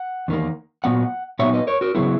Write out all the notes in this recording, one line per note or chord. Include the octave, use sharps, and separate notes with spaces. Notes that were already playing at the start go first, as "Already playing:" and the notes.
Already playing: F#5
E2 D#3 A#3
A#2 F#3 B3 F#5
A#2 F#3 B3 D#4 C#5 E5
B4 D#5
A#4 C#5
F#4 A#4
C#3 F#3 B3 E4 G#4